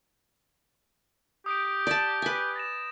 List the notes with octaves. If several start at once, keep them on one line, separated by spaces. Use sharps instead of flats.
G4 D#6 G6 D7
D5 A5
B4 G#5
A6 A#6 E7